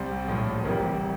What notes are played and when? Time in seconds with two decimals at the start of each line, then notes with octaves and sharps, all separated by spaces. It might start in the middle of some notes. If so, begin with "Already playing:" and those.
Already playing: C2 C3 G3 C5
0.27 A#1 A2 F3
0.64 F1 F2 E3 G3 A#4